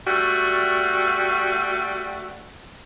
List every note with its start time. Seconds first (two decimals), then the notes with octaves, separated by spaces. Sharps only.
0.07 G3 A3 F#4